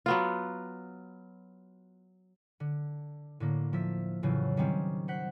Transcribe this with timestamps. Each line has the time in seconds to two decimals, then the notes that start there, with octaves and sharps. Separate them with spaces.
0.06 F#3 B3 F4
2.60 D3
3.40 A2 D3 A#3
3.73 F3 E5
4.23 F2 A2 C#3 E3 F#3
4.57 D#3 G3 C4 C#4
5.08 C5 F#5 B6